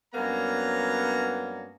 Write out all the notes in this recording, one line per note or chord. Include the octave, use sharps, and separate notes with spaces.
G2 F#3 A#3 B3 C#4 A#5